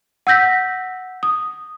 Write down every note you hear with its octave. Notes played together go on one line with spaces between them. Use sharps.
F#5 E6 G6 A#6 B6
D#6